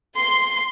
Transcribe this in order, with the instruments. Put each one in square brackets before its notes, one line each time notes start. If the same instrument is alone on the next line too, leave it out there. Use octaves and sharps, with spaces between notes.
[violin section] C6